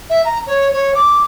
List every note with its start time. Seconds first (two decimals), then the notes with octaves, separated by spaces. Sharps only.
0.10 E5
0.25 A#5
0.47 C#5
0.72 C#5
0.95 D6